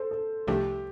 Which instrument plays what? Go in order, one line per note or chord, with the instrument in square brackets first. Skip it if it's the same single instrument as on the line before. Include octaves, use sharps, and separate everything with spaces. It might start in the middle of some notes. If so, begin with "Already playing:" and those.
Already playing: [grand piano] A4 C5
A4
[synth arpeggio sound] C2 C3 F3 A3 D4 [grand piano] G4